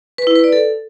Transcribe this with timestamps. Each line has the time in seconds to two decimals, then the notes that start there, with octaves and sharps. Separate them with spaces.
0.18 B4
0.27 E4
0.35 B4
0.44 D5
0.53 A4